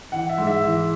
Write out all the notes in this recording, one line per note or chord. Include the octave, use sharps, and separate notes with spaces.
E3 F#5
E5
G#2
E5
E3